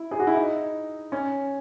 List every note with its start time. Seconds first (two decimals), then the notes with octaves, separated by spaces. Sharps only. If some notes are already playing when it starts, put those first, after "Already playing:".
Already playing: E4
0.11 G#4
0.19 F#4
0.27 E4
0.35 D#4
1.12 C#4